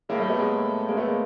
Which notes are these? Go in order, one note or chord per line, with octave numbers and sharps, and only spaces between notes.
A2 G#3 A#3
G3 A3
A3 B3
G#3 A#3
G#3 A#3
C4
A3 B3
G#3 A#3